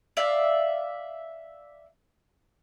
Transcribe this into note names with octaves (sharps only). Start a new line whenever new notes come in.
D5 E5 F5